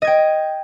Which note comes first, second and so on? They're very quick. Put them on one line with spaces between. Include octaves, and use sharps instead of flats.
D#5 G#6 G5